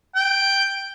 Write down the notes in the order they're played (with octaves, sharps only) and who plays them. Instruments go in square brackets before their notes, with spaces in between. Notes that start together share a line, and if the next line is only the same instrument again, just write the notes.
[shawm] G5